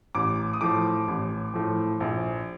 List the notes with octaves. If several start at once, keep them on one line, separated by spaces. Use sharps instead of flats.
A1 D6
D#6
A2 F3 D6
A1
A2 F3
A#1